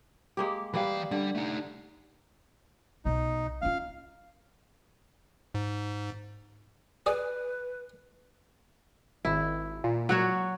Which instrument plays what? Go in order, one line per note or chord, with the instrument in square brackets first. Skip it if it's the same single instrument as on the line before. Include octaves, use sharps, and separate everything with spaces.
[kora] G#3 A#3 G4
[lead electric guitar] E3 F5 [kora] G3 A#3 B4
[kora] D3 [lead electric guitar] G3
[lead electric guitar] A3 D#4
[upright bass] B1 B2 [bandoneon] D#4
[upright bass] C#4 F4 [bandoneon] F5
[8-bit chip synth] G#2
[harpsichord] G#4 D5 [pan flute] B4
[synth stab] G#1 [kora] E4
[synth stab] A#2
[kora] F#3 F#4 C#5